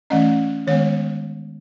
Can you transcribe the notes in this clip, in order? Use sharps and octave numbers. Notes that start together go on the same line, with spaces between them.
E3 A3 C#4 D#5
D#3 G#3 B3 C#5